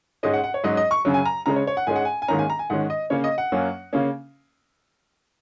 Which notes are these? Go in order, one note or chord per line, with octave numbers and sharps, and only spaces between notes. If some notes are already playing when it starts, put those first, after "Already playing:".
G#2 G#3 C#4 D#5
F#5
F#5
C#5
G#2 F#3 C#4 D#5
D#5
C#6
F#2 C#3 F#3
G#5
A#5
C#3 G#3 C#4 A#5
C#5
C#5
F#5
G#2 G#3 C#4 G#5
F#5
G#5
G#5
G#2 D#3 A#3 C#4 A#5
G#5
A#5
G#5
G#2 D#3 G#3 C#4 F#5
D#5
C#3 A#3 C#4 C#5
D#5
F#5
F#2 F#3 A#3 C#4
C#3 A#3 C#4